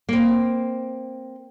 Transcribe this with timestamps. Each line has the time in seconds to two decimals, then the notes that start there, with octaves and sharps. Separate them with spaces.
0.09 A#3 C4